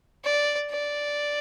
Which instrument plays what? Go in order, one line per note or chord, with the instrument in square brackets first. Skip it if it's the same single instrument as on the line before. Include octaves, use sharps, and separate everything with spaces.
[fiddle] D5
D5